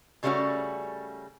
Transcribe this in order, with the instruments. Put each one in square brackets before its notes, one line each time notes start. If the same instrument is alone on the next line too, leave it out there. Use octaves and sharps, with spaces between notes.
[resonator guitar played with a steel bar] C#3 G3 A3 A#3 C#4 F#4